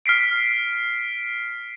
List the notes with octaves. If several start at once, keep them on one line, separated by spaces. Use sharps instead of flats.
F6 B6 C7 D7